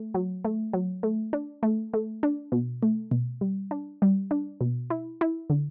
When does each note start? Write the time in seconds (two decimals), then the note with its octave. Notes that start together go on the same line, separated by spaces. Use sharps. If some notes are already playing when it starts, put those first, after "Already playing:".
Already playing: A3
0.14 F#3
0.45 A3
0.73 F#3
1.03 A3
1.33 D4
1.63 A3
1.94 A3
2.23 D4
2.52 B2
2.83 A3
3.11 B2
3.41 G3
3.71 D4
4.02 G3
4.31 D4
4.61 B2
4.90 E4
5.21 E4
5.50 D3